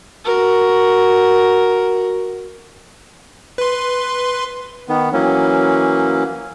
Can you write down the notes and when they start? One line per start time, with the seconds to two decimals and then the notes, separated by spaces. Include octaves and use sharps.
0.25 F#4 A#4
3.58 B4 C6
4.89 D#3 B3
5.13 E3 F#3 A#3 C#4